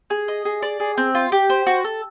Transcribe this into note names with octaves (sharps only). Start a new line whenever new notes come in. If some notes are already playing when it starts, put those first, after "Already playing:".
G#4
D#5
G#4
D5
G#4
C4
F4
G4
C5
F#4
A4